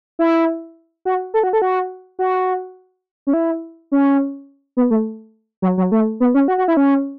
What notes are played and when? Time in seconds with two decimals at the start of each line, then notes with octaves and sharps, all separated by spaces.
0.19 E4
1.05 F#4
1.34 A4
1.43 F#4
1.53 A4
1.62 F#4
2.19 F#4
3.27 C#4
3.33 E4
3.92 C#4
4.77 B3
4.91 A3
5.62 F#3
5.78 F#3
5.92 A3
6.20 B3
6.34 C#4
6.48 F#4
6.58 F#4
6.68 E4
6.77 C#4